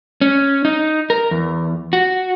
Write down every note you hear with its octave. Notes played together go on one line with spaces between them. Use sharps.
C#4
D#4
A#4
E2
F#4